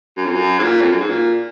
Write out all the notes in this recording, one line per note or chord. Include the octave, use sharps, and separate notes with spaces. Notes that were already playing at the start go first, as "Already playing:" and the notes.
F#2
F2
F#2
G#2
A#2
F2
F#2
G#2
A#2